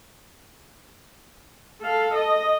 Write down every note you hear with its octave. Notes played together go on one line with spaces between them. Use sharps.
A4 F5
D#5